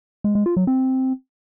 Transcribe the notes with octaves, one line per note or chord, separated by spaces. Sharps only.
G#3
G#3
F4
F#3
C4